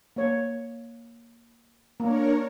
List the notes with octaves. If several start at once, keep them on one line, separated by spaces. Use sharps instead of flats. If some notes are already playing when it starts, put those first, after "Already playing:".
A#3 C#5
A#3 D4 A#4 C#5